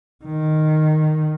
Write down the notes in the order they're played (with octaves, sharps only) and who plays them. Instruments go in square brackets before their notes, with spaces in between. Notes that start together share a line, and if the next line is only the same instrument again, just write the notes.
[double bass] D#3